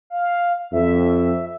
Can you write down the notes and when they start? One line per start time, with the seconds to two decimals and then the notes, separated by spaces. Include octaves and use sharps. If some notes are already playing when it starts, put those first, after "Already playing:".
0.10 F5
0.72 F2 E5